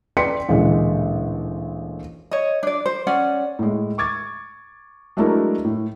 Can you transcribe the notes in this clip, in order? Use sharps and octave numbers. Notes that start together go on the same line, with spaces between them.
B4 D5 G5 C6 B6 C#7
A1 D2 A#2 G#3
C#5 D#5
D4 D5
C5
C#4 D5 F#5
A2 G#3
C#6 D6 G#6 A6
F#3 G#3 A3 D4 E4 A#4
A2